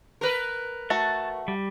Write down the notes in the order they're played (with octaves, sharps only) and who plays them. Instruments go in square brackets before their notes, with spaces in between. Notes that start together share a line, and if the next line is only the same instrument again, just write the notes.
[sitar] A#4 B4
[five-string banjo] A3 F#4 [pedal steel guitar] A5
[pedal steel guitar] G3